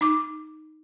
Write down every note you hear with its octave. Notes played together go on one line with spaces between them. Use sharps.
D#4 D6